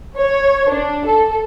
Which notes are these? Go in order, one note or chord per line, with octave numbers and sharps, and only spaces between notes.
C#5
D4
A4